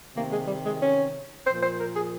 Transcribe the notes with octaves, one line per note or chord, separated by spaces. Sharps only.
C3 D#3 A#3
G#3
G3
G#3
C#4
A#2 F3 C5
C5
A#4
G#4